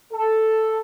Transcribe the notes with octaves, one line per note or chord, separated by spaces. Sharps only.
A4